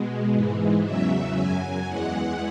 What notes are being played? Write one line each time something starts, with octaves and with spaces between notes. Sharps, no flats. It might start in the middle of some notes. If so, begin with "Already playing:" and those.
Already playing: B2 G#3
G#2 E3 G#3
E2 C#3 F#3 E5
F#2 F#3 G#5
E2 E3 G#3 F#5